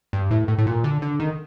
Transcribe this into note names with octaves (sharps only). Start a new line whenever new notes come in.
G2
A2
A2
A2
A#2
D3
D3
D#3